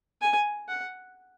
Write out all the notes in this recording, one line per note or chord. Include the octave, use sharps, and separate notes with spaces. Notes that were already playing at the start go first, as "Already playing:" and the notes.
G#5
F#5